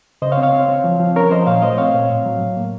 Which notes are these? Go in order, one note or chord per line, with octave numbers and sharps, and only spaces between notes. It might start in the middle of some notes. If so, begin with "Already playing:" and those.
C#3 C5 D#5
C#5 F5
C4
C#5 F5
C4
C4
F3
F3
C#4 A#4 C#5
F3 C5 D#5
A#2 C#5 F5
A3 C5 D#5
C4 C#5 F5
A#2
A2
F#3
A2
A#3